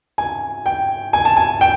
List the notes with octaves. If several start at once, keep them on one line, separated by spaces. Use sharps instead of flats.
G#5
G5
G#5
A5
G#5
G5